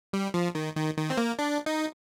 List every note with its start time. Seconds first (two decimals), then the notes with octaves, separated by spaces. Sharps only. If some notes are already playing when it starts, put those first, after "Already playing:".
0.13 G3
0.34 F3
0.55 D#3
0.76 D#3
0.97 D#3
1.10 C4
1.17 A#3
1.39 D4
1.66 D#4